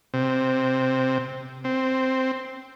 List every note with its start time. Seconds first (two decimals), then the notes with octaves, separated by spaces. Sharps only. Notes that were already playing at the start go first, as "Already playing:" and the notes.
0.14 C3
1.64 C4